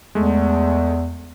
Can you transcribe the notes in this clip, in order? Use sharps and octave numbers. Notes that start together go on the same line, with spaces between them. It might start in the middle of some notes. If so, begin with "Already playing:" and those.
E2 G#3 A3